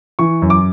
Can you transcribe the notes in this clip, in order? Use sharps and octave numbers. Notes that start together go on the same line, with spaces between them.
E3 C#6
F#2
D6